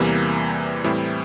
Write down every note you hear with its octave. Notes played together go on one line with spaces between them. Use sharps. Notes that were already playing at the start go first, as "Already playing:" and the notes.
Already playing: E2 C3 E3 G3 A#3
A2 E3 G3 C4 E4